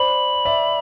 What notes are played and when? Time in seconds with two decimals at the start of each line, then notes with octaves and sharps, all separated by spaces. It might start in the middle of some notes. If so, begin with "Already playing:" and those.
Already playing: C5 D5 B5
0.45 D5 E5